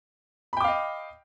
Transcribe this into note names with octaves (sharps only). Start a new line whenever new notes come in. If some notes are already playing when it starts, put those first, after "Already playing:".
D#5 F5 G5 B5 D6